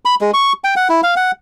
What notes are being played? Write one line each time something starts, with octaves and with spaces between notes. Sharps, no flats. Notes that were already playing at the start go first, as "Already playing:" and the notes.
B5
G#3
C#6
G5
F#5
E4
F5
F#5